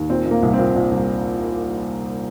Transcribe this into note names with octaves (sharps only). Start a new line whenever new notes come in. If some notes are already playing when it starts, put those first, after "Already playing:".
Already playing: D#2
A#2 C4
A#2
A#3
C2
A#2 C4
A#2
C2